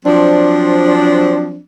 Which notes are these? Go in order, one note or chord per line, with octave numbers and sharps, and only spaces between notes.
F3 F#3 C4 D4